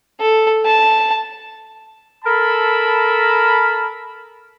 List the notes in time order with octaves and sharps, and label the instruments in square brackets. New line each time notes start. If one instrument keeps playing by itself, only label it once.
[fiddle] A4
A5
[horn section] A4 A#4 A5 B5